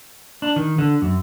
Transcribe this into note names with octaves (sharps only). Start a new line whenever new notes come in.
D4
D#3
D3
F#2